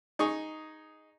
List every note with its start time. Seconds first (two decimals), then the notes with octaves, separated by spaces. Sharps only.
0.19 D#4 G#4 C#6